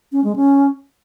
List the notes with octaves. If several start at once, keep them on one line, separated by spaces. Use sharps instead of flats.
C#4
G#3
C#4